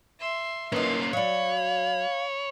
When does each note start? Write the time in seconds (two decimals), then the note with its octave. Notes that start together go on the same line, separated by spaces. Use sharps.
0.19 E5 C6
0.72 E3 A#3 C#4 D#4 A#4 F5 C6
1.13 F#3 C#5 D5 F5 B5